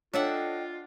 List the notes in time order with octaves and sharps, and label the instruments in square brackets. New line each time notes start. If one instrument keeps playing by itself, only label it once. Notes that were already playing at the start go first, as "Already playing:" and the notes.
[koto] D4 E5 F#5 [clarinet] F4 [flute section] A4 D#5 G5 [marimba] C#5